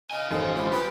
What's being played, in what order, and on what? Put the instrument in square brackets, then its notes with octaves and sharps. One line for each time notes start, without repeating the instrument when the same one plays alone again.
[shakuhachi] D#5 [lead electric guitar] F5 G#5
[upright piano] A1 [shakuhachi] D#4 [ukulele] A4 C5
[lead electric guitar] D3 G#3 [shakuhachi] F4 [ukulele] G4 C5 B5
[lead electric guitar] G4 G5 [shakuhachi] B4 [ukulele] B5